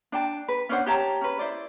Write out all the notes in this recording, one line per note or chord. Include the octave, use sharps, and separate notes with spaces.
D4 G5 A5
B4
C#4 D4 C5 F#5
G4 C#5 A5 A#5
C#4 B4
E4 C5 D5